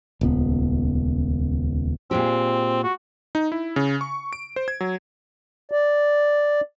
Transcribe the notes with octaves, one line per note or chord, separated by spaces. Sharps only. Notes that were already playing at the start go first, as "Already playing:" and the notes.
D#1 C#2 B3
A#2 G#3 C4 G4
F#4
D#4
E4
C#3
C#6
D7
C5
G#6
F#3
D5